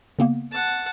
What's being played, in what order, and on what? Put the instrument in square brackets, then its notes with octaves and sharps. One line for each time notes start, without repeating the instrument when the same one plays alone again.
[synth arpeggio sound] C#3 A#3 B3
[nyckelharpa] F#5 A5